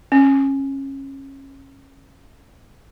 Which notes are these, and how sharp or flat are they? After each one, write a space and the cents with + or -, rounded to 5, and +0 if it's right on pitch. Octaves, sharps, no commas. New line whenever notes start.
C#4 -25